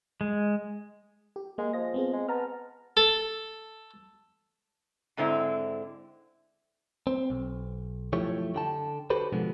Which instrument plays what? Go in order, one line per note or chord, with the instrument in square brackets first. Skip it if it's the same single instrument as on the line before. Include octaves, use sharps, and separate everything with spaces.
[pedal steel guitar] G#3
[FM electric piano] G4
[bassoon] G#3 [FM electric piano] A#3
[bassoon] F3 [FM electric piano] D#5 A#6
[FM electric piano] B3 C4 G#4
[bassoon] G#3
[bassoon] B3 [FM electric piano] A5 A#5 F6
[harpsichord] A4
[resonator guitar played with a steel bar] G#2 D3 C4 E4
[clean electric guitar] C4
B1
F#2 F3 A3 E4 G4 C#5
D3 G5 A5
F#4 G4 A4 B4 C5
B2 D3 F3 G#3 B3